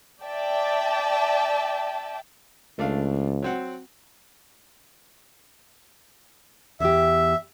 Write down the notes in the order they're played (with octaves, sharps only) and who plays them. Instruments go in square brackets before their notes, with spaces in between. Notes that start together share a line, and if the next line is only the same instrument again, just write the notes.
[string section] D5 E5 G5 A5
[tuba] C#2 [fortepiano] A3 D4 F5
[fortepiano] F#3 C4 F#5
[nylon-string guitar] E2 G4 [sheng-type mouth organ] E5